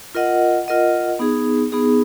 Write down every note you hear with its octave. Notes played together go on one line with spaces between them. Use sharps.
F4 A#4 D#5 F#5
F4 A#4 D#5 F#5
B3 D#4 G#4
B3 D#4 G#4